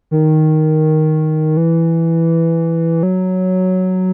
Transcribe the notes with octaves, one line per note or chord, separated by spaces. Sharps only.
D#3
E3
F#3